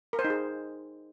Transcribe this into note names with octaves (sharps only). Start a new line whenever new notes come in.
A#4
C5
D#4
G#4